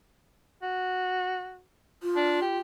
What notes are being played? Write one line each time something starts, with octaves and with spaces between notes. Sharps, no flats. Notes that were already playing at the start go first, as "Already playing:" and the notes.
F#4
F4
D4
G4